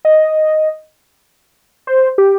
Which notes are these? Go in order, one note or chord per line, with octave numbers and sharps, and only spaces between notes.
D#5
C5
G4